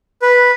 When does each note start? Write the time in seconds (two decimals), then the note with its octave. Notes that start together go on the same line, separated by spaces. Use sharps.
0.22 B4